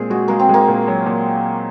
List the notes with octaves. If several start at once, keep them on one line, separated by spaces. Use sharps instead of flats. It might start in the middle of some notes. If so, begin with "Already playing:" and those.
Already playing: A#2 G#3 C4 G#4
G#3 F#4
G#3 A#3
C4
G#3 A#3
A#2
F#3
A#2